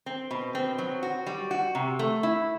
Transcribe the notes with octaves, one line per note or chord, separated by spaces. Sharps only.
C4
B2
C4
F#3
F#4
G3
F#4
C3
A3
E4